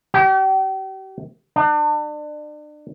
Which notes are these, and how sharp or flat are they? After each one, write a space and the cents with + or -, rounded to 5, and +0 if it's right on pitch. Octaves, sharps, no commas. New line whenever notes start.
G4 -40
D4 +35